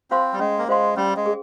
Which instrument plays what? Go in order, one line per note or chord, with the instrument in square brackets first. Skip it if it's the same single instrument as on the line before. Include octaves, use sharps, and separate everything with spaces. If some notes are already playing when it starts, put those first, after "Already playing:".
[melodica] C4 [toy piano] F4 C5 F5 C6
[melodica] G3
[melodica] G#3 [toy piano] C#4
[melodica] A#3
[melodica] G#3 [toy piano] F4 C5 F5 C6
[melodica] G3 [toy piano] C#4
[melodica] G#3
[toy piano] G#4